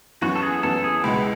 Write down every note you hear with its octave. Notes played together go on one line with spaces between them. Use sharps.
F#2 E3 B3 F#4
A4
G#4
F#2 E3 B3 A4
G#4
C#2 B2 G#3 B3 E4